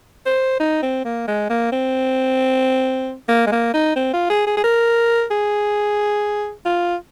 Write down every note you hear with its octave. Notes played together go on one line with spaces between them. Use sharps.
C5
D#4
C4
A#3
G#3
A#3
C4
A#3
G#3
A#3
D#4
C4
F4
G#4
G#4
G#4
A#4
G#4
F4